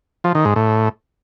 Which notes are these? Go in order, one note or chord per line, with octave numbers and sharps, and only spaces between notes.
F3
D#3
G#2
A2